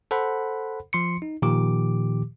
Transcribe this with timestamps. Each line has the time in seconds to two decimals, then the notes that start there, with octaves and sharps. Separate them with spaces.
0.11 A4 C5 F#5 B5
0.93 F3 C6 C#7
1.22 D#4
1.42 A#2 D#3 F3 G4 D6